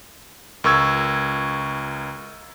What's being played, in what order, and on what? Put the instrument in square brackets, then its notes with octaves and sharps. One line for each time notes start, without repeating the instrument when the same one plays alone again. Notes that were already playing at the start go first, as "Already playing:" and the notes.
[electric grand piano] C#2 A#4 C#6 E6 G#6